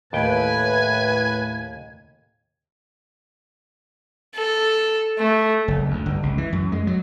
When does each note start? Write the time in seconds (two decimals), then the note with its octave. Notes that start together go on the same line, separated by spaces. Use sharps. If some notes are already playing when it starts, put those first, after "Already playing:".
0.13 D#2 A2 B4 G5 G#5
4.36 A4
5.18 A3
5.68 F#1
5.91 D2
6.06 G1
6.23 C#2
6.38 E3
6.53 F#2
6.72 G#3
6.87 F#3